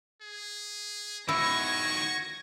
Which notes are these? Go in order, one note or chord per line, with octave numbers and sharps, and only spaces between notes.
G#4
D#3 E4 F#4 C#6 G#6 A#6